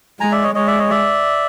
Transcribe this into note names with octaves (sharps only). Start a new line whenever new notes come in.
G#3 G#5 A#5
D5 E5
C#5 D#5
G#3 C#5 D#5
D5 E5
C#5 D#5
D5 E5